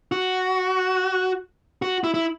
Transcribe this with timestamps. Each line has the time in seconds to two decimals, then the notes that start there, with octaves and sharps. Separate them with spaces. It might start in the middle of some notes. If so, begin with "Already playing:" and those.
0.12 F#4
1.82 F#4
2.04 E4
2.14 E4